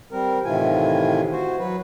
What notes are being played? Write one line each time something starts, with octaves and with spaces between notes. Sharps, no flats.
G3 C4 A#4
A2 C3 D#3 E3 F4 G#5
F#4 C5
F#3 B4